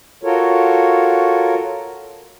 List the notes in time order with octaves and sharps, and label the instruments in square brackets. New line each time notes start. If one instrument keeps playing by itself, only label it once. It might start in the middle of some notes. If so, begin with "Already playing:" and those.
[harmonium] F4 F#4 A4 A#4 C#5